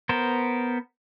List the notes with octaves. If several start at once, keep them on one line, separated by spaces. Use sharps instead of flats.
B3 A#4 C5